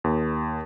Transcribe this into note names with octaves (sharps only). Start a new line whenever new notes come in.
D#2